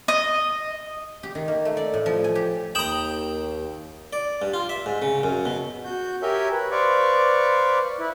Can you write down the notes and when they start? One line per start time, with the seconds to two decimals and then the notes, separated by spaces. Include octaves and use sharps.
0.08 D#5
1.23 G4
1.35 D#3
1.48 A#3
1.65 A3
1.77 D5
1.94 A2
2.06 F3
2.24 G#5
2.35 G4
2.75 D#2 G5 A#5 D#6 E7 F#7
4.13 D5
4.42 G2
4.54 F4
4.69 E5
4.86 G#2
5.02 C#3
5.23 F#2
5.45 B2
5.84 F#4 G6
6.22 G4 A#4 C#5 E5 G#5 G6
6.52 B4
6.72 B4 C5 D5 F5 C#6 D6
8.00 E4 B4